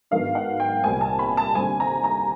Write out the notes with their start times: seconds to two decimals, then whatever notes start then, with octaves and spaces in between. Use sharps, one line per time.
0.11 G#2 D#3 F#3 B3 D4 F5
0.35 F#5
0.60 G5
0.83 C2 A#2 G3 C4 G#5
1.01 A5
1.19 B5
1.37 A5
1.55 D#2 D3 G3 C4 G#5
1.80 A#5
2.04 A#5